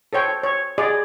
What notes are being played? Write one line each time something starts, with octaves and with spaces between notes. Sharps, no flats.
A4 C5 C#5 G5
C#5
G#4 D5 D#5